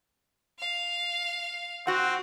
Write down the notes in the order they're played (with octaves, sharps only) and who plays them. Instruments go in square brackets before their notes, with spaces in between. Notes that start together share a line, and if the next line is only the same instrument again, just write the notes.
[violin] F5
[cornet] C4 [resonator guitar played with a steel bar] F#4 F#5